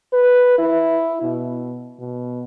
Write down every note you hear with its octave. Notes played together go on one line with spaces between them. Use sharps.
B4
E4
B2
B2